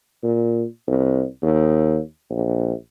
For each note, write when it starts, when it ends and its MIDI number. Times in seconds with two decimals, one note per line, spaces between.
0.23 0.65 46
0.87 1.24 36
1.42 2.00 39
2.30 2.73 34